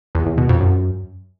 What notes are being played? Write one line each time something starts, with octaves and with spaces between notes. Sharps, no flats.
E2
E2
B2
F2
F#2